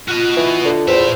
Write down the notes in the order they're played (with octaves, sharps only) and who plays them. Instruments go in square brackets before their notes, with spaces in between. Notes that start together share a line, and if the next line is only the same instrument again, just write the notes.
[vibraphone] F4 [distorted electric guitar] F#4 D#5
[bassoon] E3
D3
[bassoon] E2 [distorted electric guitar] A2 E5 [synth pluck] C5